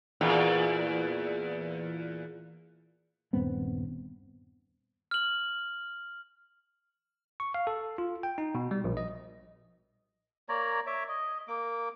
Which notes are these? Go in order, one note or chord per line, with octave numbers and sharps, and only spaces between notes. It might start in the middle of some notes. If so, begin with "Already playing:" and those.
E2 A#2
D#1 G2 B3 C4
F6 F#7
C#6
F5
A4
F4
G5
D#4
B2
G3
A#1
D#5
A#3 C#5 D5 A#5
C#5 E5 D6
D#5
A#3 D6